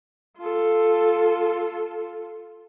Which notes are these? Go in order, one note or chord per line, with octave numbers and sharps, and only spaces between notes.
F4 A4